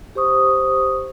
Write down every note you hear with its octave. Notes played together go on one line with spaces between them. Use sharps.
G4 C5 C#6 D#6